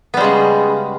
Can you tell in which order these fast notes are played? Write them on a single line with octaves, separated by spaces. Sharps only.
B3 G3 G#3 C#3